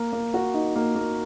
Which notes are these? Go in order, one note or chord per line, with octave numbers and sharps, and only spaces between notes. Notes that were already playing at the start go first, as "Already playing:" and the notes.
Already playing: A#3
A#3
F#4
D#4
A#3
A#3